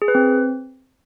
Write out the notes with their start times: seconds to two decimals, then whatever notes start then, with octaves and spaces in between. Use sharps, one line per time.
0.02 G#4
0.08 B4
0.15 C4